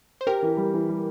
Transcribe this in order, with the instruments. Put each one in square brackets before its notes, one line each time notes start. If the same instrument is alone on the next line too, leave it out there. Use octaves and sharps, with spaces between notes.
[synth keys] C5
[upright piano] G4 [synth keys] A#4
[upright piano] E3
G3
E3
G3